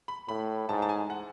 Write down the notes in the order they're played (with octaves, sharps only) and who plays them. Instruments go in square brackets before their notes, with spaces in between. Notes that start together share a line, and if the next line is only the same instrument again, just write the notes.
[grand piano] B5
[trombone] A2 [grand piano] B5
[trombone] G#2 [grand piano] A5
[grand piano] A5
G#5
F#5